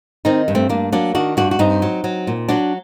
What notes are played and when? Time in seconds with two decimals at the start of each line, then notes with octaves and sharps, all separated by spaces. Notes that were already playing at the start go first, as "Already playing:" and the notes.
0.25 D#3 C4 D#4
0.48 G2
0.55 A3 C4
0.69 G2 A#3 D4
0.92 F#3 A#3 D4
1.15 D#3 D4 F#4
1.37 G2 D4 F#4
1.51 F#4
1.59 G2 C4 D#4
1.82 F#3
2.04 F#3
2.27 A#2
2.48 F#3 D4 F#4